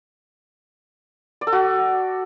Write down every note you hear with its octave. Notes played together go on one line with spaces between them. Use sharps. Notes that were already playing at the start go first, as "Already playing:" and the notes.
D5
A4
F#4